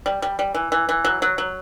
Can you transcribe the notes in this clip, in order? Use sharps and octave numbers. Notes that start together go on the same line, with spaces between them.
G3
G3
G3
E3
E3
E3
F#3
F#3
F#3